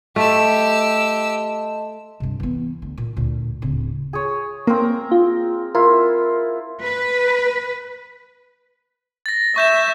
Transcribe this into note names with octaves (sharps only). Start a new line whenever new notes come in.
A3 G4 D#5 A5 C6 E6
G2 C3
E3 B3
D2
A#2
D2 A#2
D1 C#3
G#4 C#5
A#3 C4 A#4
F4
E4 F4 A#4
B4
A6 A#6
E5 C#6 G6 E7